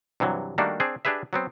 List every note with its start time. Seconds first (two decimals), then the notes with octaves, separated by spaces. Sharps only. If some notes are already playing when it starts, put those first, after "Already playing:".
0.20 G2 C3 E3 F#3
0.58 D#3 G3 A3 A#3 D4 F#4
0.80 C4 D4 G#4
1.05 D4 G4 G#4 B4 E5
1.33 F#3 B3 C4